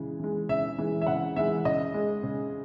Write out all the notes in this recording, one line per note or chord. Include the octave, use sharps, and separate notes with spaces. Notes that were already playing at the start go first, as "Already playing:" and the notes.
Already playing: C#3 E3 G#3
E3 G#3
C#3 E5
E3 G#3
E5
C#3 F#5
E3 G#3 E5
C#3 D#5
G#3
C#3